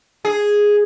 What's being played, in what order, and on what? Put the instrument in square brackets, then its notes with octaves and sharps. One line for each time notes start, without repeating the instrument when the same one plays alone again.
[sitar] G#4